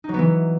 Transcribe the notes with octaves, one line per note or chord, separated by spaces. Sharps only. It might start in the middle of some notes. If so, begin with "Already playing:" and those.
E3 F#3 B3 D#4